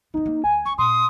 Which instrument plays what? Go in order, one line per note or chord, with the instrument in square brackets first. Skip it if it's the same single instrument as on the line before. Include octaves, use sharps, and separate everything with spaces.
[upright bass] B3 E4 [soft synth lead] D#4
[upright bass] A#3
[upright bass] D2 [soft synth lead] G#5
[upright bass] C#2 [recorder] C#6
[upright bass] A#2 [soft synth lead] C6 [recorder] D#6